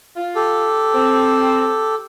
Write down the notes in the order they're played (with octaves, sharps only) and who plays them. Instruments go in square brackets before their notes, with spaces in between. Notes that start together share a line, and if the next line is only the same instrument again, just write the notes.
[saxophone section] F4
[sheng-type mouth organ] G4 A4
[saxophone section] C4